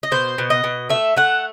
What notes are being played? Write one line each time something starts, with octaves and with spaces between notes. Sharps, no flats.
D#5
B2 C5
B2
D#5
B2
A3 E5
A3 F#5